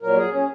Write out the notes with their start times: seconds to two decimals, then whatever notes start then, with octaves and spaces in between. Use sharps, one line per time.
0.02 A#2 F#3 A#4
0.17 G#4
0.32 C#4